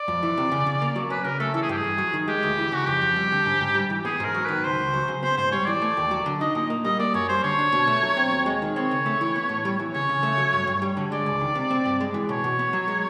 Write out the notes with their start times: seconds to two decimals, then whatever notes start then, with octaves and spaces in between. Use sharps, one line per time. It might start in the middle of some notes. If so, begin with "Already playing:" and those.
Already playing: D5
0.08 F2
0.23 E3
0.37 C3
0.52 C#3
0.67 C#3
0.82 A#3
0.96 F#3
1.10 C#4 B4
1.25 C#3 A#4
1.40 A3 A4
1.54 E3 A4
1.62 G#4
1.69 G2 G4
1.77 G#4
1.84 G2
1.98 F#3
2.13 D#3
2.28 G#3 G4
2.43 D2
2.58 E3
2.72 C#3 F#4
2.87 F2 G4
3.01 F2
3.16 G3
3.32 D3
3.46 G#2
3.61 G#2
3.75 G3
3.90 E3
4.05 B3 G#4
4.20 G#2 A#4
4.35 F#3
4.45 D#3 B4
4.64 C#2 C5
4.79 C#2
4.93 F#3
5.08 C#3
5.23 B3 C5
5.37 G#2 C5
5.52 G3 C#5
5.67 E3 D5
5.82 A3
5.97 D#2
6.11 F#3
6.26 D3
6.41 D#4 D#5
6.55 A#2 D#5
6.70 A#3
6.85 G3 D#5
6.99 A#3 D5
7.14 F#2 C#5
7.29 G3 C5
7.43 D3 C#5
7.59 D4
7.72 B2
7.87 A3
8.03 F#3
8.17 C4
8.32 D#2
8.46 G#3
8.62 D#3
8.76 C4 C#5
8.91 C#3
9.06 A3
9.21 E3
9.36 B3
9.49 A2
9.65 G3
9.80 E3
9.94 C#3 C#5
10.09 C#3
10.23 A3
10.38 F#3
10.53 G2
10.67 G2
10.82 G3
10.97 D3
11.12 G#3 D5
11.26 C#2
11.41 D#3
11.55 C3
11.71 C4
11.85 G2
12.01 G#3
12.14 E3
12.29 B2 C#5
12.44 B2
12.59 B3
12.73 F#3
12.88 G#3